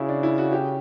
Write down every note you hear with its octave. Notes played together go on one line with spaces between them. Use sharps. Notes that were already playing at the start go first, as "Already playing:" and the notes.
Already playing: C#3 E4 F#4
D4
E4
F#4
G4